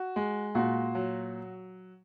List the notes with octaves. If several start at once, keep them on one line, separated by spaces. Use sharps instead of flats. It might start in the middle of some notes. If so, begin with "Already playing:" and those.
Already playing: F#4
G#3
A#2 F#4
F#3